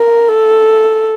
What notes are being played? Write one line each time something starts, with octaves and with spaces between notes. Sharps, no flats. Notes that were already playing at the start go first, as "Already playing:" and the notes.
Already playing: A#4
A4